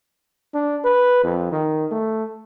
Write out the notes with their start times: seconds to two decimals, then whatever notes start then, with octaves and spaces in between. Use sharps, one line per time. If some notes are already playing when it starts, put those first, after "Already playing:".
0.54 D4
0.85 B4
1.24 F2
1.52 D#3
1.91 A3